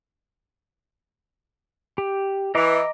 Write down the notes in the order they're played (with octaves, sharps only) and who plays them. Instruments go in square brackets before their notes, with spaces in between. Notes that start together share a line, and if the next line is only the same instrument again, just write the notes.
[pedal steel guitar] G4
[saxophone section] E3 [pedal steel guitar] D#5 A#5 D6